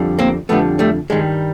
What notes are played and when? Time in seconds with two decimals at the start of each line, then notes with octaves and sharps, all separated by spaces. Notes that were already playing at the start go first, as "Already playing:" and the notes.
Already playing: F2 D3 G3
0.19 A#3 C4
0.49 F2 D3 G3 A3 B3
0.79 G3 A3
1.10 G2 D#3 G3 G#3